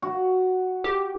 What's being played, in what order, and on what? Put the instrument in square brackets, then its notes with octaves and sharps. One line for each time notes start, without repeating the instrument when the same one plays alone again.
[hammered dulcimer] F#4
[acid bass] G4